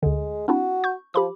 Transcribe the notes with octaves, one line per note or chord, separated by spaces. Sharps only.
D2 D3 G#3
C4 D4 E4 F#4
C#6 G6
F3 G4 B5 D6